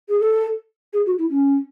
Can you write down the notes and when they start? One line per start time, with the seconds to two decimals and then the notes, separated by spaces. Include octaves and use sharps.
0.09 G#4
0.20 A4
0.93 G#4
1.06 F#4
1.18 E4
1.30 C#4